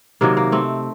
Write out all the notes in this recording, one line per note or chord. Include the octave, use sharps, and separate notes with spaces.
C3 D#3 F#3 A#3
A#3
A3 C4